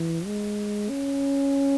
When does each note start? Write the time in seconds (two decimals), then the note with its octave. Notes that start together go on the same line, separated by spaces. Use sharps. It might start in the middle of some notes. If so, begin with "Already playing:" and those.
Already playing: E3
0.26 G#3
0.89 C#4